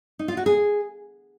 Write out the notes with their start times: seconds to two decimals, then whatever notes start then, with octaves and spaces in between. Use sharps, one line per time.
0.19 D#4
0.28 F4
0.37 F#4
0.46 G#4